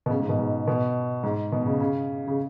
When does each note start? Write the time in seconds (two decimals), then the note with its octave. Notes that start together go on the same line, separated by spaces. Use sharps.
0.06 B2
0.10 C#3
0.20 G#2
0.29 B2
0.39 G#2
0.67 B2
1.23 G#2
1.52 B2
1.66 C#3
1.80 C#3
2.27 C#3